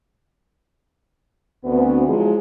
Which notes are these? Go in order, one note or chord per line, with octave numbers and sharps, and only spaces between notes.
D2 B3 C4
F3 F#3 G#3 E4 G#4